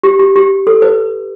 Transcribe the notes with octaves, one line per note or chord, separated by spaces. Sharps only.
G4
G4
G4
A4
B4